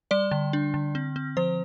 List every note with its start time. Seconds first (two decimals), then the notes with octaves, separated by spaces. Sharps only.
0.11 G3 D5
0.31 D3
0.53 D4
0.74 D3
0.95 C4
1.16 C4
1.37 F3 C5